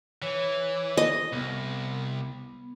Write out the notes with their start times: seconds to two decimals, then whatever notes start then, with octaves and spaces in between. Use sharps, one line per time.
0.22 E3 C#5
0.97 D#5
1.33 C2 B3